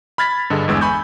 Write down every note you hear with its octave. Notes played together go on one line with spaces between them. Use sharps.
B5 F6 G#6 A6 B6
G2 D3 G#4 D#5
G1 E2 G#3 E6
G#5 B5 C#6 G6